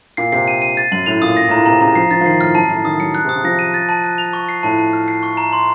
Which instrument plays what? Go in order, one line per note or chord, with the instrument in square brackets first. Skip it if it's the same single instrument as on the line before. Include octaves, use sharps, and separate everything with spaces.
[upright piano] A#2 [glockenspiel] C7
[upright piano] C3 [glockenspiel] C7
[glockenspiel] D#7
D#7
A6
[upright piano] F#2 [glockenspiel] F#7
[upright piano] A2 [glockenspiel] F7
[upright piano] A#2 [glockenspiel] D#6
[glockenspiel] A#6
[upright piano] A2 [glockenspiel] A#5
[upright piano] A#2
[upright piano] C3 [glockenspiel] A#5
[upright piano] C#3 [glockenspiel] A#5
[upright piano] F3 [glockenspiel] C7
[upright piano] F3 [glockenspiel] A6
[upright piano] F3
[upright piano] D#3 [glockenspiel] C7
[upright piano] A2 [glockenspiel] F6
[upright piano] F#2 [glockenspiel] A5
[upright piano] A2 [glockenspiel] A5
[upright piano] D#3 [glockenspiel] D#6
[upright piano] F#3 [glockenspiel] C#7
[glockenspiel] F#6
[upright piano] C3 [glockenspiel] D#6
[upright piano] C#3
[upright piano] F3 [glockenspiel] A#6
[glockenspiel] D#7
A6
A5
F#6
F7
C#6
C7
[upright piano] A2 [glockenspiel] A5
[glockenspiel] A5
F6
C7
C#6
A#5
C6